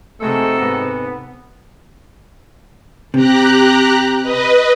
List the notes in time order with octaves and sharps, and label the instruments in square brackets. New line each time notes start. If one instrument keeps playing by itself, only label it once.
[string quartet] C3 [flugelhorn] G#3 [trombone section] A3 [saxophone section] D#4 F#4 A4
[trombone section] G#2 [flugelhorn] B3
[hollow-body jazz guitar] C3 [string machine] G4 A#5 F#6
[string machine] B4 D#5